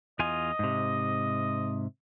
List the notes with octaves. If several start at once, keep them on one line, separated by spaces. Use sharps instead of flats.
E2 F4 D#5 G#5
G#2 C3